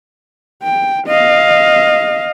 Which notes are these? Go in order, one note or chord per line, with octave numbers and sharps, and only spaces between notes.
G5
D#5 F5